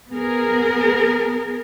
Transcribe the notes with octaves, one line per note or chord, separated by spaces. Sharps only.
B3 G#4 A#4